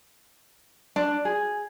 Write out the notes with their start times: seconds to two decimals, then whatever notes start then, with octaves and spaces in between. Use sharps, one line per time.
0.96 D4
1.25 G#4